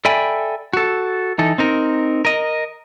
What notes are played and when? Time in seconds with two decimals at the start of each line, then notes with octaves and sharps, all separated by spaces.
0.05 A4 D5 E5 G5 G#5 B5
0.73 F#4 A4
1.39 E3 D#4 A4
1.58 C4 D#4 A#4
2.25 A#4 D#5